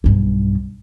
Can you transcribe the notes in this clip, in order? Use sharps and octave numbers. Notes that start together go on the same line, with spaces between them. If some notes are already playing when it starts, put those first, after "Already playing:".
B1 G2